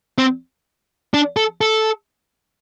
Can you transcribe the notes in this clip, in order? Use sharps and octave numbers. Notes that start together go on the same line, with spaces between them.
C4
D4
A4
A4